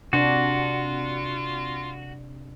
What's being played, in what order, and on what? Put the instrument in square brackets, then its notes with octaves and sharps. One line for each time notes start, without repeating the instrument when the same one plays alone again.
[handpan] C3 D4 [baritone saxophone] F4 [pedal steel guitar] F#4